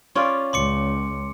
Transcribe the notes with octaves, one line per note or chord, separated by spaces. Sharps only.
C#4 F4 D5
C#2 C6 D6 C#7